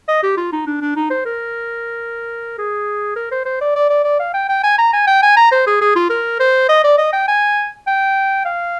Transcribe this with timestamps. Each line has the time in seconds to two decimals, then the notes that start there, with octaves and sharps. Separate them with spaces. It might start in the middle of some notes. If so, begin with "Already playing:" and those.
0.08 D#5
0.23 G4
0.37 F4
0.52 D#4
0.66 D4
0.81 D4
0.96 D#4
1.10 C5
1.26 A#4
2.58 G#4
3.16 A#4
3.31 C5
3.45 C5
3.61 D5
3.75 D5
3.90 D5
4.04 D5
4.19 F5
4.34 G5
4.49 G5
4.63 G#5
4.78 A#5
4.93 G#5
5.07 G5
5.22 G#5
5.37 A#5
5.52 C5
5.66 G#4
5.81 G#4
5.96 F4
6.10 A#4
6.40 C5
6.69 D#5
6.84 D5
6.98 D#5
7.13 G5
7.28 G#5
7.87 G5
8.45 F5